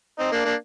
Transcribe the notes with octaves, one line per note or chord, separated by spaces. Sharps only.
C4 D#4
A#3 D4
A#3 D4